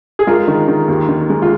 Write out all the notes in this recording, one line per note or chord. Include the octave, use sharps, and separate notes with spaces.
G#4
G#3 F4 A#4
D#3
D#3
D#2
D#3
G#3
F4